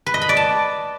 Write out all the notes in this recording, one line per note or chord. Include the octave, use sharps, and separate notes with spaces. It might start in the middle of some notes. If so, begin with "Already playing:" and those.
B4
D#5
B5
D5
A5